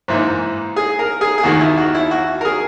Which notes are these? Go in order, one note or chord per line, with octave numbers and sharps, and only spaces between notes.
G#2 E3 A#3 D#4
G#4
A#4
G#4
G#4
D#2 D#3 A#3 D#4 F#4
E4
F#4
E4
F#4
A#4
G#4